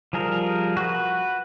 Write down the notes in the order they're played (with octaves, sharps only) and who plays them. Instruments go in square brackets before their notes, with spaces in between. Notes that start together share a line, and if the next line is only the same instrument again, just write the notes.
[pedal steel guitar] F3 G3 G#4 A#4
F#4 B4